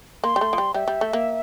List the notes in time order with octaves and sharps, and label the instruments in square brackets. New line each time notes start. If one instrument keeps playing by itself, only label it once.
[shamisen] A#3 [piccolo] C6
[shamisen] G3
A3
F3
G3
[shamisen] G3 [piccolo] E5
[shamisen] G3
A3
A#3